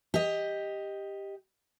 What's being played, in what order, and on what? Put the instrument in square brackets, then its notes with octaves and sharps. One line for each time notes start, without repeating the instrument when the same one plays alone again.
[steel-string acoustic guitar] G4 D#5